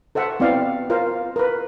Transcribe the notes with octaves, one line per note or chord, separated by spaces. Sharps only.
A4 C5 E5 F#5
B3 C4 E4 D5 F5
F4 A#4 C5 F5
A#4 B4